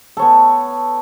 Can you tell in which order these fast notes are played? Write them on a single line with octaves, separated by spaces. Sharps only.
A4 C#5 B3